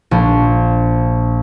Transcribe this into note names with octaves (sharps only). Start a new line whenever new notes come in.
A#1